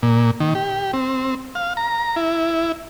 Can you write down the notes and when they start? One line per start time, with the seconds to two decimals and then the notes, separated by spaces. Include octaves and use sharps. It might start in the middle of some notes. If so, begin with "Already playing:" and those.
0.03 A#2
0.40 D#3
0.55 G4
0.94 C4
1.55 F5
1.77 A#5
2.16 E4